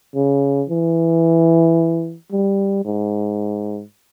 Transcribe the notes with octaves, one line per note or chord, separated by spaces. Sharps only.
C#3
E3
G3
G#2